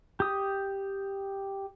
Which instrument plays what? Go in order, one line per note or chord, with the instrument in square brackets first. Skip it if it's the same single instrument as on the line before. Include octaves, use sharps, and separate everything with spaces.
[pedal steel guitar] G4 D#6